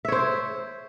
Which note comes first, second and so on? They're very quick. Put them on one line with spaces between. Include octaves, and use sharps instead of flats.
E5 C#5 C5